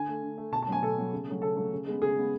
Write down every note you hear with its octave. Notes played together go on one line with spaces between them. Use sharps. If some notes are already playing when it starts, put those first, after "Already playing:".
Already playing: D3 G#5
A3
D3
A3
B2 A5
A5
F#3 B3 G#5
B2 A4
F#3 B3
C#3
F#3 A3
C#3 A4
F#3 A3
C#3
G#3 B3
C#3 G#4
G#3 B3